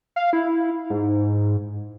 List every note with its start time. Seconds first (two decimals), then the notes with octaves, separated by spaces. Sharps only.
0.16 F5
0.33 E4
0.90 G#2